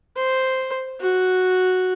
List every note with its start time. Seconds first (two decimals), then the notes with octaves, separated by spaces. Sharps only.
0.17 C5
1.01 F#4